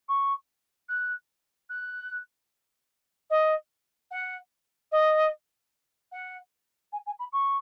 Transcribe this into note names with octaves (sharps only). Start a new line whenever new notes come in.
C#6
F#6
F#6
D#5
F#5
D#5
F#5
G#5
G#5
B5
C#6